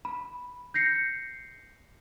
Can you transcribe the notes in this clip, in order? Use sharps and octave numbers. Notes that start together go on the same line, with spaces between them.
B5
G6 A#6 C7 C#7